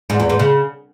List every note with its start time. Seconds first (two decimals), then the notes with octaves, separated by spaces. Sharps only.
0.10 G#2
0.20 E2
0.29 G#2
0.39 C#3